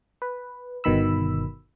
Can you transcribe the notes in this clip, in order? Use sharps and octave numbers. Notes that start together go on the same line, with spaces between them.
B4
G1 B2 D#3 B5 E6